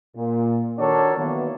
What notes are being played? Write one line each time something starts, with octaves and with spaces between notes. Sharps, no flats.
A#2
D#3 D4 F#4 A4 A#4 C#5
D#3 E3 F#3 A#3 B3